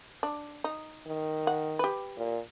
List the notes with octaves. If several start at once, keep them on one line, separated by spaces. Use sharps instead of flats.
D4
D#4
D#3
F#5
G4 B4
A#2